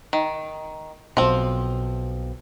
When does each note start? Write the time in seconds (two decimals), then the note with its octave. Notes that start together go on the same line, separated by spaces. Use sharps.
0.13 D#3
1.17 B1 B2 F3 C4